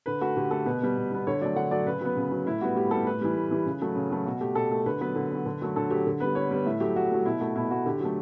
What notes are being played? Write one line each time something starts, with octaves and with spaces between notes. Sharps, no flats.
D3 B4
A3 F#4
D3 G4
A3 A4
B2 B4
G3 B3
B2
G3 B3
D3 C#5
F#3 A3 D5
D3 F#5
F#3 A3 D5
C#3 B4
F#3 B3 B4
C#3
F#3 B3
A2 E4
G3 B3 F#4
A2 G4
G3 B3 A4
A2 B4
E3 G3
A2
E3 G3
C#3
F#3 A3
C#3
F#3 A3
B2 F#4
A3 G4
B2 A4
A3
D3 B4
F#3 B3 B4
D3
F#3 B3
D3
F#3 A3
D3 A4
F#3 A3 G4
D3
G3 B3 B4
D3 C#5
G3 B3
A2 E5
F#3 A3 G4
A2 F#4
F#3 A3
B2 E4
A3 F#4
B2 E4
A3 F#4
D3 G4
F#3 A3